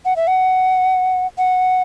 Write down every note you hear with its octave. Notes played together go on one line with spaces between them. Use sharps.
F#5
E5
F#5
F#5